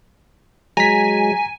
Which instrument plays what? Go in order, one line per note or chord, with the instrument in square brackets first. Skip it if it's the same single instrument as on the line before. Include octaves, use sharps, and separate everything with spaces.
[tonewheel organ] F#3 G#3 [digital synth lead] G#5 [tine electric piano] A#5 B6